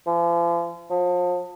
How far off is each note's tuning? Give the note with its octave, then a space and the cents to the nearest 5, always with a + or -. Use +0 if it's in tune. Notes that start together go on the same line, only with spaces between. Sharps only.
F3 -40
F3 +35